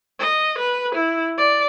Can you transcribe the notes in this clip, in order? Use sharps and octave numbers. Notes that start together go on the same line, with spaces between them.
D#5
B4
E4
D5